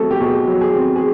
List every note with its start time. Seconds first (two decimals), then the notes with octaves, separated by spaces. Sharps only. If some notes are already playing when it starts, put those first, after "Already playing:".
Already playing: B2 F#3 A3 C4 A4
0.11 G4
0.20 B2 G#4
0.48 F#3
0.61 G#4
0.75 C4
0.96 G#4